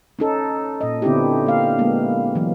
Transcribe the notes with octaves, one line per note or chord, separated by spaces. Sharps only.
C#4 D#4 A4
A#2 D#5
D3 B3 C4 D4 E4 G4
A#3 F5
G#3 A#3 B3
E3 F#3